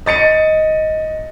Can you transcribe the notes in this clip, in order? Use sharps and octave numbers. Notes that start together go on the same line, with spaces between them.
D#5 A6 C#7 D#7